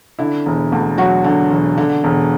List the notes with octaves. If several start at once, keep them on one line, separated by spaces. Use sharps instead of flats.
D3 E4
E1
D2
F#3 F#4
D3
E1
D3
E1